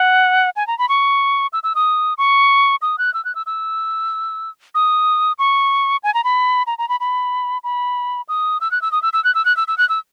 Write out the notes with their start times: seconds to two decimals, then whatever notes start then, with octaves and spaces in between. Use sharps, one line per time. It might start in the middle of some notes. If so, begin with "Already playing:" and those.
Already playing: F#5
0.56 G#5
0.67 A#5
0.79 B5
0.89 C#6
1.53 E6
1.63 E6
1.75 D#6
2.18 C#6
2.82 D#6
2.98 F#6
3.14 E6
3.25 F#6
3.35 E6
3.46 E6
4.75 D#6
5.39 C#6
6.04 G#5
6.14 A#5
6.24 B5
6.67 A#5
6.78 A#5
6.89 B5
7.00 B5
7.64 B5
8.29 D#6
8.61 E6
8.72 F#6
8.82 E6
8.92 D#6
9.03 E6
9.13 E6
9.24 F#6
9.35 E6
9.45 F#6
9.57 E6
9.68 E6
9.78 F#6
9.89 E6